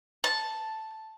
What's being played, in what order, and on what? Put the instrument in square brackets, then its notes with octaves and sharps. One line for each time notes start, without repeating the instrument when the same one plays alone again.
[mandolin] A5